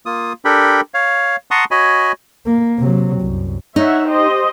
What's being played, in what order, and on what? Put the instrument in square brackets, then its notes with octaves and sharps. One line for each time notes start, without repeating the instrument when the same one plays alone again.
[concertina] A#3 F4 D#6
D4 G4 A4 A#4 G5 B5
C#5 F5
F#5 A5 A#5 C6 C#6 D#6
F#4 C#5 D#5 G#5 B5
[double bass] A#3
C3 F#3
C2 F#2
[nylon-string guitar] D#4 [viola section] C#5 E5 F#5
[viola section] G4 C5 D#5